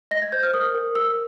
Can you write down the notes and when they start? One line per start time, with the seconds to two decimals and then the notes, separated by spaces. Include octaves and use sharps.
0.11 D#5 A#6
0.22 G#6
0.32 C5 G6
0.43 F6
0.54 A#4 D#6
0.75 A#4
0.95 A#4 E6